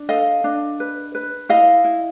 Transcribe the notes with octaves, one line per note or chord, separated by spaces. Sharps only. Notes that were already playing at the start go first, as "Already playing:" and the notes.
Already playing: D4
A4 D#5 F5
D4
B4
B4
E4 D#5 F5
E4